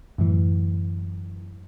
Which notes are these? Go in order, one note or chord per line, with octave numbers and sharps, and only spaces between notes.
F#2 A2 E3